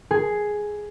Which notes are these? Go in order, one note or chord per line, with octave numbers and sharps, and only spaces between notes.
G#4